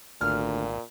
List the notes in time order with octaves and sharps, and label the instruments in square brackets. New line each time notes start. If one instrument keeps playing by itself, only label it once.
[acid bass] G#1 [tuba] D2 [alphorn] A#2 [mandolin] F6